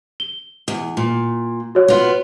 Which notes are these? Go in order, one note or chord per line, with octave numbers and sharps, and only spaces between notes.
G7
E2
A#2
F#4 C#5
B3 F4